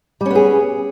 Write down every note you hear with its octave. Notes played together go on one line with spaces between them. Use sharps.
G3 B3 C#4 G#4